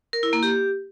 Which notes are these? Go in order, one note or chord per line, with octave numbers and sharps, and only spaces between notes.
A#4
E4
A#3
G4